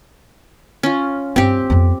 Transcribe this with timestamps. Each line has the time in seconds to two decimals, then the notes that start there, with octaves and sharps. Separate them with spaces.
0.83 C#4 F4
1.36 G2 C4 G4
1.70 F2 B3